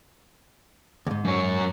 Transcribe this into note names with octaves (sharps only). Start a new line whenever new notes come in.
D#2 G#2
F#2 C#5